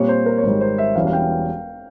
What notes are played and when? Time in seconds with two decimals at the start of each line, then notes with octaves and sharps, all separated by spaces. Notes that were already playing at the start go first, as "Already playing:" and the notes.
Already playing: A#2 G3 C4 G4 C#5
0.08 C5
0.26 A#4
0.38 C#5
0.43 G#1 G#2 G3 C5
0.61 C5
0.78 E5
0.95 E1 E2 E3 G3 C#4 F5
1.07 F5
1.13 G5